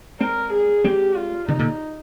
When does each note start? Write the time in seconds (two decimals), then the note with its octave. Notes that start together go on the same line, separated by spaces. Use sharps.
0.20 G#3 C4 A#4
0.53 G#4
0.84 G#3 C4 G4
1.16 F4
1.48 C3 D#3 D#4
1.59 A#2 D3